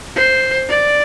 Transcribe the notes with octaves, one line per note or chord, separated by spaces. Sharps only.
C5
D5